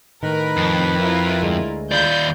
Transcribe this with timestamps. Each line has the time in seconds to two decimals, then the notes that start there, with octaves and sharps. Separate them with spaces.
0.23 A2 D#3 A#4 B4 B5
0.57 F2
0.96 E4 F4 A#4
1.43 D2 G#3
1.92 D#2 F4 D5 B5 C6 G6